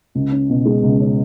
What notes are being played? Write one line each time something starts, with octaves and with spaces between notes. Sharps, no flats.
C#2
C#4
B2
G#3
C#2
C#4